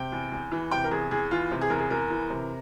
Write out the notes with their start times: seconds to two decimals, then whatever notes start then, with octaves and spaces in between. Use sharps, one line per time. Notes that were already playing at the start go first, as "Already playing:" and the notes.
Already playing: C3 G5
0.12 E2
0.32 E2
0.52 E3
0.71 C3 G5
0.84 A#4
0.91 E2 G#4
1.11 E2 G#4
1.31 E3 F4
1.51 C3
1.61 G#4
1.70 E2 A#4
1.78 G#4
1.90 E2 A#4
2.10 E3
2.30 C3